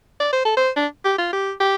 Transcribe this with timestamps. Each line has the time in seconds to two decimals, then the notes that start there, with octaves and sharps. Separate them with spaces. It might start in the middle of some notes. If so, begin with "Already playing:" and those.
0.20 D5
0.32 C5
0.45 A4
0.57 C5
0.76 D4
1.04 G4
1.18 F4
1.33 G4
1.60 G4